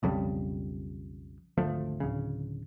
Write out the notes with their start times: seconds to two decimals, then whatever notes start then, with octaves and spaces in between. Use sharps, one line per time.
0.03 B1 F2 C#3 G3
1.58 G#1 D2 F3 A3
2.00 D1 C#3